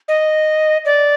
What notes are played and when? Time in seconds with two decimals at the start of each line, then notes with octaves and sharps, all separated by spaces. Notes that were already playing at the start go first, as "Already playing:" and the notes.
0.08 D#5
0.85 D5